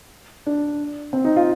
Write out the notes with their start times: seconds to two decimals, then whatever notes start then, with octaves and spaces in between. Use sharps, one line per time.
0.46 D4
1.13 C4
1.25 D#4
1.36 F4